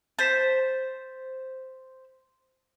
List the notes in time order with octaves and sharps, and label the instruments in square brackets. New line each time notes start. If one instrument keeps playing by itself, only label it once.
[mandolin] C5 [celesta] A6 B6 E7